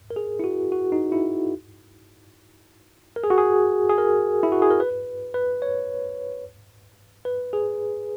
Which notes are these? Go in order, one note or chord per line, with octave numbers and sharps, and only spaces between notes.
A#4
G#4
E4
F#4
F#4
D#4
E4
A#4
G#4
F#4
G#4
G#4
A#4
E4
F#4
G#4
A#4
B4
B4
C#5
B4
G#4